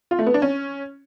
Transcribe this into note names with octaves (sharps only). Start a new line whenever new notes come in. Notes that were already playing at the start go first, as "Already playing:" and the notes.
F4
A3
B3
D4
C#4